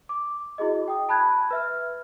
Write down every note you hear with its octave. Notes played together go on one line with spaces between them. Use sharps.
D6
E4 F#4 G#4 D#5
G5 D#6
A5 B5 F#6 G#6
B4 E5 F6